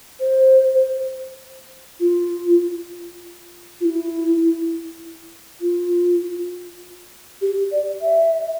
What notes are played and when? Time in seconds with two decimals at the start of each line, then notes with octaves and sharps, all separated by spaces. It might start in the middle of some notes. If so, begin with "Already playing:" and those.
0.20 C5
2.00 F4
3.81 F4
3.85 E4
5.61 F4
7.41 G4
7.72 D5
8.01 E5